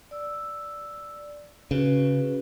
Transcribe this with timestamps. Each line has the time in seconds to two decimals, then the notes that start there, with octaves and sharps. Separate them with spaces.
0.11 D5 E6
1.71 C#3 C#4 F#4 B4